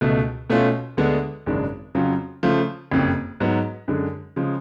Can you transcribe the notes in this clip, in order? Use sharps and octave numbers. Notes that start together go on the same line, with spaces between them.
C#2 B2 A3
B2 A3 C#4 F4
D2 D3 G#3 B3 D4
G#1 F#2 C#3 G#3 D4
F2 C#3 F#3 C#4 F4
C#3 F3 A3 F4
F#1 F2 C#3
G#2 F#3 B3
F#2 D3 G#3
C#3 F3 G#3